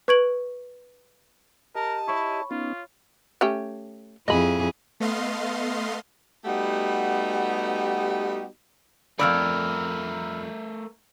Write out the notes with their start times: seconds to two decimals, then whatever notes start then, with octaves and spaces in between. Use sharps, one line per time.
0.08 B4 C#6 G#6 D7 F#7
1.75 G4 A#4 D#5 A5
2.08 E4 C#5 B5 C#6
2.51 B3 C#4 D#4 F4
3.41 A3 C#4 G4
4.28 F2 E4 G#4 D#5 B5
5.00 A3 B3 D#5 F5 C6
6.45 G3 A3 B3 D#4 F#4 G4
9.19 F2 C#3 A3 A#4 D5 B5 E6 F6